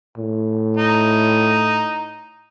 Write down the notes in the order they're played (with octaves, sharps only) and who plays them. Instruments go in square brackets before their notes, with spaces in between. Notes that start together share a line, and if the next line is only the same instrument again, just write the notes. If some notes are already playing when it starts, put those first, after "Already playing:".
[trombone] A2
[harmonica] D#4